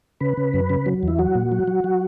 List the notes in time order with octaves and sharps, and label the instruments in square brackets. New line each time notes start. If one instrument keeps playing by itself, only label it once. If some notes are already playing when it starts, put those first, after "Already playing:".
[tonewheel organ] C#3 B4
C#3
F#2
C#3
F#3
E2 E4
F#3 F#4
A#2
F#3
F#3
F#3